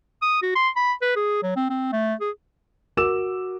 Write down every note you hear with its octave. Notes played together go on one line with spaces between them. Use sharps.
D#6
F#4
C6
B5
B4
G#4
F#3
C4
C4
A3
G#4
F#4 A#4 D6 E6 E7